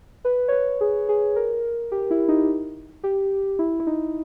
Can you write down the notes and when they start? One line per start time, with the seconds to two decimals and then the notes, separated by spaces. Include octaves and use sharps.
0.25 B4
0.48 C#5
0.52 B4
0.81 G#4
1.09 G#4
1.36 A#4
1.92 G4
2.11 E4
2.28 D#4
3.04 G4
3.59 E4
3.80 E4
3.87 D#4